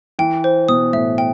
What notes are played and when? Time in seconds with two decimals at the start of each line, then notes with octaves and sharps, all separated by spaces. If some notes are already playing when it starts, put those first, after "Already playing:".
0.19 E3 G5
0.44 C5
0.68 B2 D#6
0.93 A2 E5
1.18 G5